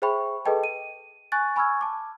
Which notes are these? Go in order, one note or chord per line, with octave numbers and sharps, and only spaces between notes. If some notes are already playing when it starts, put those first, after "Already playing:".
G#4 C5 E5 G5 B5 C#6
G#4 A4 B4 D#5 G5 A5
D#7
G#5 C#6 F#6 A6
G#5 B5 C#6 E6 F6 G#6
A5 D6